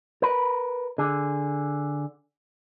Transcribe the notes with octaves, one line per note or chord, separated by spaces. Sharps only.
A#4 B4
D3 G#4